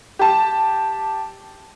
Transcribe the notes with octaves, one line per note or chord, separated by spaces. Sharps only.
G4 A5